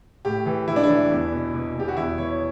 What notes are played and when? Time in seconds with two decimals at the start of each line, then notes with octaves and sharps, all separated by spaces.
0.25 A2 G4
0.46 E3
0.68 E3 E4
0.76 D4
0.84 E4
0.89 E3
1.11 E2
1.32 B2
1.54 B2
1.75 B2 G4
1.88 F#4
1.97 E2 E4
2.18 E3 C#5